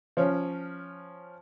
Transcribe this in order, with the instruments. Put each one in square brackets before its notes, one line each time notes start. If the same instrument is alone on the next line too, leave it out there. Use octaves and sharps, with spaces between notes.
[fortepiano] F3 C#4